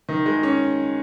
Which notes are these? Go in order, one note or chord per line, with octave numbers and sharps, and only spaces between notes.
D#3
G#3
C#4